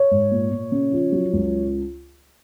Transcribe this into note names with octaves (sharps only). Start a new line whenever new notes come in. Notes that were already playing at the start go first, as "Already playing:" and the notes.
Already playing: C#5
G#2
A#2
A#2
C#3
F3
F#3
C#2